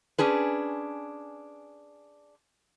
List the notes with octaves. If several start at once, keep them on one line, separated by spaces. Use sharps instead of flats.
C#4 D4 G#4 B4